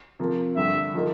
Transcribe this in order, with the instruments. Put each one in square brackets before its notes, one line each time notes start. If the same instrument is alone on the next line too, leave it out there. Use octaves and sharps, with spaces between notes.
[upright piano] C3 F3 A#3
[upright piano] G2 D3 G3 [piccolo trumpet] E5
[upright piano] F3 A#3 D#4